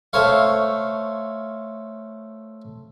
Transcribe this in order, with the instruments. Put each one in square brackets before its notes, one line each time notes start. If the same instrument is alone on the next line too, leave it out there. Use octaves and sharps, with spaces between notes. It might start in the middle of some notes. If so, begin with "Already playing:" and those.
[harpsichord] A3 C5 C#5 F5